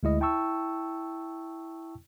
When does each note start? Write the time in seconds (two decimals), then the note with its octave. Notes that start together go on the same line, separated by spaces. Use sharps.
0.03 D2 G#3 E4 D#5
0.20 E4 G5 A5 C#6 E6